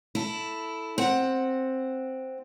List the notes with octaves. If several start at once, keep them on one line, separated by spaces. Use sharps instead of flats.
E4 A4
C4 F#5